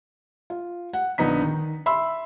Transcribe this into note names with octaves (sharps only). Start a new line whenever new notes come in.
F4
F#5
A#1 D3 B3 D#4 B6
D#3
E5 B5 C6 E6